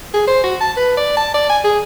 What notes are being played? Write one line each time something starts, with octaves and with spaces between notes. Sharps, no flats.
G#4
C5
F#4
A5
B4
D5
A5
D5
G#5
G#4